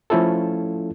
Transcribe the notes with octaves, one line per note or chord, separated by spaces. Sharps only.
F3 A3 C#4 E4 F4 A4